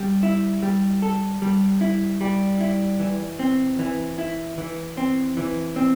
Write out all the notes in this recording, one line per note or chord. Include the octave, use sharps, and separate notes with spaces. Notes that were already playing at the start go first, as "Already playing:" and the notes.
Already playing: G3
E4
G3
A4
G3
E4
G3
E4
E3
C4
E3
E4
E3
C4
E3
C4